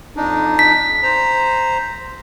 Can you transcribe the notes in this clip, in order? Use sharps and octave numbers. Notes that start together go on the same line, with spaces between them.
F2 D4 D#4
B6
C5 A#5